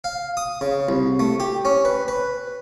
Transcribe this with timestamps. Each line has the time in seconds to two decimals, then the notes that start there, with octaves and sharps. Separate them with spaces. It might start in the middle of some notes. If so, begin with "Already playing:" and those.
0.04 F5
0.37 D#6
0.61 C#3
0.89 C2
1.19 A3
1.40 G4
1.65 C#4
1.85 B4
2.08 B4